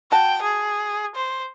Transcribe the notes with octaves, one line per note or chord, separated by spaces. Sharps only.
F#4 G5 A5
G#4
C5